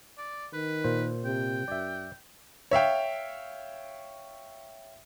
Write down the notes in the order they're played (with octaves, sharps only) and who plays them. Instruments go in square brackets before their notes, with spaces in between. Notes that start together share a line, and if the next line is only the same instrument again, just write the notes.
[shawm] D5
[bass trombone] D#3 [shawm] B4
[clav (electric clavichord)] A#2 C5
[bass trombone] C3 [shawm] G5
[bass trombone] F#2 [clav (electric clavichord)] D5 E5
[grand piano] C#5 E5 F5 G5